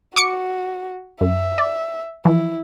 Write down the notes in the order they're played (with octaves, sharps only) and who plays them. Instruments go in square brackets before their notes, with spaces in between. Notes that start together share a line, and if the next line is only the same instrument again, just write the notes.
[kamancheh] F#4 [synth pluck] C#6 D6 C#7
[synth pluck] F#2 [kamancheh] E5
[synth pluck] D5
[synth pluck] E3 F3 [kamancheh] E4